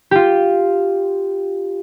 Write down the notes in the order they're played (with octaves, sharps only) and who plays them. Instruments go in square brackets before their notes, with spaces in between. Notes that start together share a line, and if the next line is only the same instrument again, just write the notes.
[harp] F4 G4